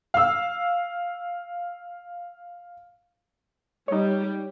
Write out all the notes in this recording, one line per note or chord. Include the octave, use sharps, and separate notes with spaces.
F5 E6
G3 D#4 C#5